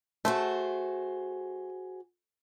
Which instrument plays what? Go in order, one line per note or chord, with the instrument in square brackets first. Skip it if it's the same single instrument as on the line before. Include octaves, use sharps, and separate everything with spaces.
[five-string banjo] A3 [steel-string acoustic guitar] F#4 G#4 C5